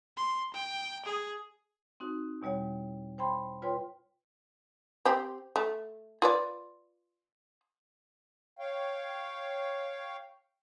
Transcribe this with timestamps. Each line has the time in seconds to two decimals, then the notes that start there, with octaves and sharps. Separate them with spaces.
0.17 C6
0.53 G5
1.05 G#4
2.00 C4 D#4 F#4
2.42 E2 B2 G3 C#5 F#5
3.18 C5 G5 B5 C6
3.62 F4 B4 C#5 G5 C6
5.05 C4 G4
5.56 A3
6.22 F4 B4 D5
8.59 C#5 F5 G5